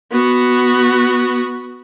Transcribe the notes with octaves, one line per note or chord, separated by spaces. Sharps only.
B3 F#4